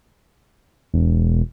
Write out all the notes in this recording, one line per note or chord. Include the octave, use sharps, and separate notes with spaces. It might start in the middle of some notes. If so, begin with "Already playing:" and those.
E1